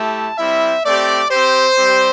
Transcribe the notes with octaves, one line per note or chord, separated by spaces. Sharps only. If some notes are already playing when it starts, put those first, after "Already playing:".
Already playing: A3 E4 G4 A5
G3 C4 E4 E5
A3 C4 G4 D5
C4 G4 C5
G3 C4 G4